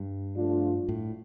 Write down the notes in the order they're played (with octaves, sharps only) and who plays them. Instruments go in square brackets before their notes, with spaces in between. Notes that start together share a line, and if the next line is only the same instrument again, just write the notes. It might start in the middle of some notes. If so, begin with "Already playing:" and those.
Already playing: [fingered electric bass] G2
[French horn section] F3 A3 D4 F4
[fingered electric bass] A2